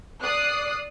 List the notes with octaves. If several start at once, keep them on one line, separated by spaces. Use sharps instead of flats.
D5 D#6 F#6 C7